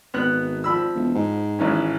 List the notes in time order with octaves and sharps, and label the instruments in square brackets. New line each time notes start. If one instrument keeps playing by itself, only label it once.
[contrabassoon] G#1 [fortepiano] B3 F#6
[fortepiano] F3 B5 E6
[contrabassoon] E1
G#2
[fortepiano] G#1 E3 C#4